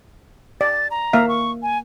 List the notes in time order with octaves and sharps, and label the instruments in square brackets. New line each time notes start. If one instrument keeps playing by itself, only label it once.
[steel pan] D5 [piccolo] A6
[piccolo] A#5
[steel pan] A#3 E5 F5
[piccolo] C#6
G#5